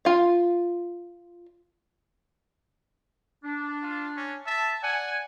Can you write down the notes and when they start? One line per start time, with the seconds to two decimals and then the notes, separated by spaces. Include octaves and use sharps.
0.05 F4 F5
3.44 D4
3.83 F4
4.17 C#4
4.46 E5 A5
4.83 D5 F#5 G#5